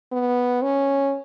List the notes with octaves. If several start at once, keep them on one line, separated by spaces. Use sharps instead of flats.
B3
C#4